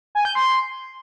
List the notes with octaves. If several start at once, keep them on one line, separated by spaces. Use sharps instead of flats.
G#5
G6
C6